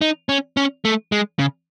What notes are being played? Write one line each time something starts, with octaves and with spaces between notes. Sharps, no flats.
D#4
C#4
C#4
A3
G#3
C#3